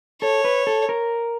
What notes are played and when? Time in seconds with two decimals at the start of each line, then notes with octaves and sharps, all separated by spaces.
0.22 A4 C#5
0.45 B4
0.67 A4
0.89 A#4